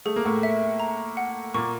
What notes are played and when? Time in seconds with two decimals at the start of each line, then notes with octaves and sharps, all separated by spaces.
0.05 A3 G#4
0.16 A#3
0.25 A2 A3
0.43 E5
0.80 A#5
1.17 F#5
1.54 A#2 A#3 C#6